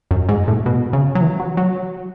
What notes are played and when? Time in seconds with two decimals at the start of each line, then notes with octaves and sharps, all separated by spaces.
0.11 F#2
0.29 G#2
0.48 A2
0.66 B2
0.93 C#3
1.15 F#3
1.21 E3
1.40 F#3
1.57 F#3